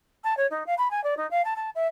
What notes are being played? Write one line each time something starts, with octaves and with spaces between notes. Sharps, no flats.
A5
C#5
D#4
F5
B5
G#5
D5
D#4
F5
A5
A5
E5